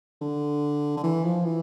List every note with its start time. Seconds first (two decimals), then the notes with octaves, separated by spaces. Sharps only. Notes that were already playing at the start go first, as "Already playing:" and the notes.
0.22 D3
0.97 D3
1.03 E3
1.25 F3
1.45 E3